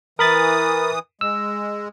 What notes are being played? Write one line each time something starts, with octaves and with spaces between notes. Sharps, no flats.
E3 A#4 B5 D#6 A6
G#3 E6